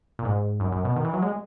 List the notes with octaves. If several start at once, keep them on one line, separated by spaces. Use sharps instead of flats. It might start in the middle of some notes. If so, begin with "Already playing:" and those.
A#2
G#2
F#2
F#2
B2
D#3
E3
F#3
G#3